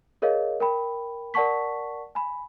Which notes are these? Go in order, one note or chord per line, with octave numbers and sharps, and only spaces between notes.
G#4 A#4 C#5 D#5 F5
A#4 G5 B5
A#4 D5 F#5 A5 C#6 B6
G#5 B5